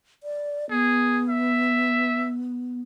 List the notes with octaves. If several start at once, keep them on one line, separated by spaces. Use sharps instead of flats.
D5
B3 G#4
E5